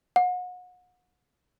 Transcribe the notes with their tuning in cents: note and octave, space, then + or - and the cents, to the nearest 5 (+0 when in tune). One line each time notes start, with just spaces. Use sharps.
F#5 -35